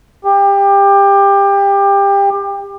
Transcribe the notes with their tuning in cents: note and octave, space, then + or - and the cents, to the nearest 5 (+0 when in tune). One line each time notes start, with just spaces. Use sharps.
G4 +25